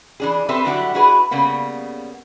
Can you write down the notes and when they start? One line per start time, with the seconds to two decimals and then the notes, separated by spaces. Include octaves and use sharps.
0.20 E3 D4 G#4
0.49 C4 G4 A4 B4 E5
0.65 D3 F#3 G3 E4 F#4 G4
0.94 D4 E4 F#4 G#4 B4
1.31 C#3 G3 A#3 B3